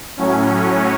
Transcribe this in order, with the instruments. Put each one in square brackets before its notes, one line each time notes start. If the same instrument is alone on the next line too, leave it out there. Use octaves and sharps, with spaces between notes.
[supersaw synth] A2 F#3 C#4